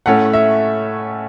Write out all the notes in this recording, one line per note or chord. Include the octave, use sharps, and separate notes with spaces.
A2 A3 C#4 A4 C#5 F#5
E5